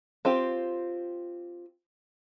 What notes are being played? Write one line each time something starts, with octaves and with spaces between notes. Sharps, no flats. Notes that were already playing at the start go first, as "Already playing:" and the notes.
C4 F4 G4